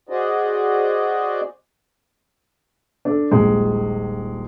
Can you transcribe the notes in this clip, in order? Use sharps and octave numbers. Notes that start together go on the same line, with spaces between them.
F#4 G#4 C5 D5 D#5
D4 A4
D#1 A#1 G#3